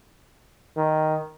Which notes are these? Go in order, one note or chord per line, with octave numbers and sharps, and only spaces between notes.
D#3